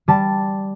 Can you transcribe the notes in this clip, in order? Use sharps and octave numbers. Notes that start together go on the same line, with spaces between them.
G3 A5